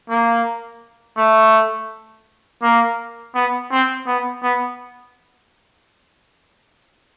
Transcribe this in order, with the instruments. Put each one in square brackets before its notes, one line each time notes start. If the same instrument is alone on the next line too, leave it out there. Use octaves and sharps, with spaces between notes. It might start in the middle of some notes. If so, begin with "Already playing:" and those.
[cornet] A#3
A3
A#3
B3
C4
B3
B3